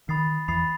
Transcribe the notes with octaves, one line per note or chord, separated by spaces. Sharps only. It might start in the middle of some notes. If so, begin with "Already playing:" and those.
D#3 B5 D#6 A6 C7
E2 B5 D#6 A6 C7